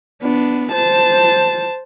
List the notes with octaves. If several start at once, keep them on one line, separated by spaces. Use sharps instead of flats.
B3 D4
C5 A5